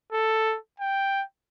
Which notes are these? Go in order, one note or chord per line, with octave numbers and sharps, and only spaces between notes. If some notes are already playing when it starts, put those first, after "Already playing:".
A4
G5